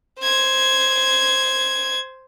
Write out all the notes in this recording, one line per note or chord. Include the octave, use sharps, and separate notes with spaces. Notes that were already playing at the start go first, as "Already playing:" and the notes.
C5 G#6